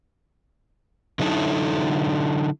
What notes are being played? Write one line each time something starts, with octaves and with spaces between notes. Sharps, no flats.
D3 F#3 D#4 E4 A4